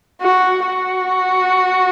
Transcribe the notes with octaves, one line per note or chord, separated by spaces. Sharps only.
F#4
F#4